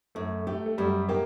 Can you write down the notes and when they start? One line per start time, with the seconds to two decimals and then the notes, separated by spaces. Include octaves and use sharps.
0.15 F#2 A3
0.47 A3 G4
0.66 A3
0.78 F#2 G3
1.09 A#3 G4